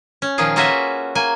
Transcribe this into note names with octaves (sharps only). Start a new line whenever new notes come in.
C#4
A#2 D#3 F3 F4 G#4
A#3 C#4 F4 F#4 B4 E5
A#3 G#5